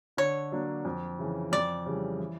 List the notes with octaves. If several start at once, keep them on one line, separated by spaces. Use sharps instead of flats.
D3 C#5
F#3 A#3 D4
F2
C#3 E3
F2 D5
C#3 E3 G3
E3